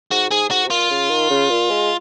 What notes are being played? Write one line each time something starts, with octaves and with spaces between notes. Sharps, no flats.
G#2 F#4
G#2 G#4
G#2 F#4
C3
A#2 F4
C#3
D#3
C#3
A#2
G#3